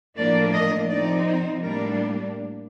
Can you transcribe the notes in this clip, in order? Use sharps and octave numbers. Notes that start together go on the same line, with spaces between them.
A2 F3 A#3 D4 D5
D#5
C3 F3 C4 D#4 D5
C5
A2 G3 A#3 D4 A#4